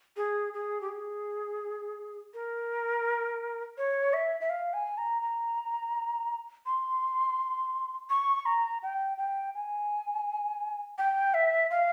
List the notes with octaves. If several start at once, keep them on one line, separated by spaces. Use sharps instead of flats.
G#4
G#4
G4
G#4
A#4
C#5
E5
E5
F5
G#5
A#5
A#5
C6
C#6
A#5
G5
G5
G#5
G5
E5
F5